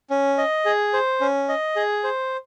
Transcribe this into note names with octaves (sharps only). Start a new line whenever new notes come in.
C#4
D#5
G#4
C5
C#4
D#5
G#4
C5